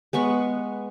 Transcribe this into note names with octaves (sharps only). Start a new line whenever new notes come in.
G#3 B3 C#6